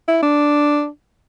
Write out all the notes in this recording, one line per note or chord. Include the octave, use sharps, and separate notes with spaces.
E4
D4